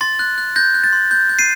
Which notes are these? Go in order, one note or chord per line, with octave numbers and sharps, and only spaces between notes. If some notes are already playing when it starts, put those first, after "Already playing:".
C6 A6
F#6
F#6
F#6 G6 A#6
F#6
A6
C6
G6
G6
C7 D#7